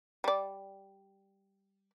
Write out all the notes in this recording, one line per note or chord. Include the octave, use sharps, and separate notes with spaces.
G3 D5